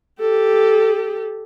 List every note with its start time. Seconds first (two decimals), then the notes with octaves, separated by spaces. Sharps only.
0.20 G4 A4